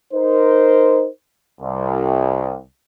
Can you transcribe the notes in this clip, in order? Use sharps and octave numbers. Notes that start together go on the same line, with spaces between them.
D#4 A#4 C5
C2